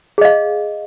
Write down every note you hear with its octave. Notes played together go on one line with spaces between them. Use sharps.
G#4 D#5 F5